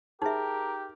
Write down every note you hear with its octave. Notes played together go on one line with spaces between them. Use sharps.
D#4 G4 G#4 A#4 E5